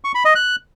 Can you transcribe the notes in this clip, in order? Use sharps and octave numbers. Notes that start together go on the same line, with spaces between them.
C#6
B5
D#5
F#6